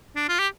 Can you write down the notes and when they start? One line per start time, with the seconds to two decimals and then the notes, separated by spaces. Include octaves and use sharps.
0.16 D4
0.29 F4
0.39 G4